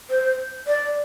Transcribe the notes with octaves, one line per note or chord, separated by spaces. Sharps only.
C5
D5